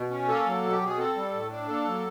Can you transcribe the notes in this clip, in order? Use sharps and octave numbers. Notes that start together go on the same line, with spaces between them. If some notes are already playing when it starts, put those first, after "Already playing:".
Already playing: B2
C#4
A#3 A4
F#3
B2
G4
B2 G#4
C4 A4
G3
A2
D4
A#3 A4
F#3